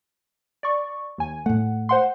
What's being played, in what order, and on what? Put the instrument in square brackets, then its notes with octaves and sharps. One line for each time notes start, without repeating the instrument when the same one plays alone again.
[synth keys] D5 C#6
D#2 G#5
[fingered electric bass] A2 A3 [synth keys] F#5
[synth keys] C5 F#5 C6